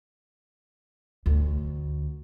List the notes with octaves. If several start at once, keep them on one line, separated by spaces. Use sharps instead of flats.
D2